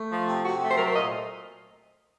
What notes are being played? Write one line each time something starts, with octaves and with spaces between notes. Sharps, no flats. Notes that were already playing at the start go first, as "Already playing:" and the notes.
Already playing: A3
F3
C3
C3 F#4
A3
C5
F#3 A#4
C5
A#2 D#5